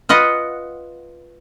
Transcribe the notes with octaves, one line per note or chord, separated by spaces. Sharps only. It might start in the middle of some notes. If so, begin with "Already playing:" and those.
F4 B4 D#5 F#5